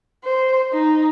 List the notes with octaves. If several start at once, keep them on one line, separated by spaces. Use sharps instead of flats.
C5
D#4